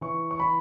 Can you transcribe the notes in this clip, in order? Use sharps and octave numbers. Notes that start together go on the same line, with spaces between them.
E3 C#6
C#6
E3 B5